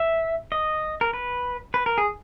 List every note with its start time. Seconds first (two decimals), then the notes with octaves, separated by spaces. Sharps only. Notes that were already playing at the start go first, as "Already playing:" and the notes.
Already playing: E5
0.52 D#5
1.01 A#4
1.13 B4
1.74 B4
1.86 A#4
1.98 G#4